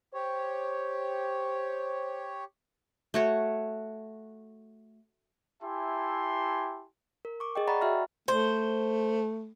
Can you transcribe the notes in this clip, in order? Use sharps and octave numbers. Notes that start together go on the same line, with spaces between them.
G4 C5 C#5
A3 F#4 C#5
E4 G4 E5 G#5 A5 C6
A#4
C#6 D6
G#4 D#5 G5
D5 F#5 A#5 B5 C#6 A6
F#4 E5 G5 A#5 F6 A#6
A3 C5